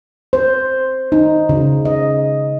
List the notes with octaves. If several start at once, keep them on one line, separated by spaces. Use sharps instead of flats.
C5
D#4
C#3
D#5